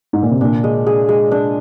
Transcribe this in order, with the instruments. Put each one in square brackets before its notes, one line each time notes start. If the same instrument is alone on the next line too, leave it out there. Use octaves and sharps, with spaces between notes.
[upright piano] G#2
A#2
C3
[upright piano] A#2 D3 [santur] D4
[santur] G#3
G#4
G#3
D4